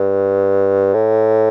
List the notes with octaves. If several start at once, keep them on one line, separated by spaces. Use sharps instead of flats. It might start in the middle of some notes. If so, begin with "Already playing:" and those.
Already playing: G2
A2